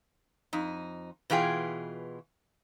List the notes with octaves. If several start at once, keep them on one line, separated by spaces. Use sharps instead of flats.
F2 D#4
B2 E3 F4 G#4 G5